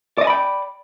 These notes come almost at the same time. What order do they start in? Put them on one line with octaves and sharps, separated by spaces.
D5 D#5 G#5 B5 G5